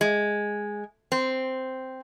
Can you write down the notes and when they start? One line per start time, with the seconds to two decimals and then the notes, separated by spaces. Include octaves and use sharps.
0.01 G#3
1.12 C4